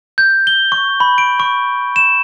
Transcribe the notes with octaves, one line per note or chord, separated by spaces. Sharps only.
G6
G7
C#6
B5
D7
C#6
E7